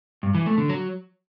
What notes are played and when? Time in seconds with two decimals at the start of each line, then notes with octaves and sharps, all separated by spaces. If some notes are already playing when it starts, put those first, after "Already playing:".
0.23 G2
0.35 E3
0.46 A3
0.58 D3
0.69 F#3